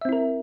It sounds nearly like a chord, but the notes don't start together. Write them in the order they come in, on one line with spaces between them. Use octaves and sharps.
E5 C4 E4 A#4